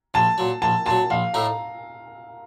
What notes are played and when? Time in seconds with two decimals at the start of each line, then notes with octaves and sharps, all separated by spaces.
0.14 A#1 A5
0.38 A#2 F#3
0.62 A#1 A5
0.86 A#2 F#3 A5
1.10 A#1 F5
1.34 A2 A3 D#4 A#5